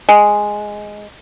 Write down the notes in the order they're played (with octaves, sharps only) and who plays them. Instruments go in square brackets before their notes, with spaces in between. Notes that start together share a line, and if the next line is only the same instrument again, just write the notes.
[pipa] G#3